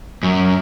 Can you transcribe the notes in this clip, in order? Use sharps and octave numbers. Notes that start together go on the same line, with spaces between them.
F#2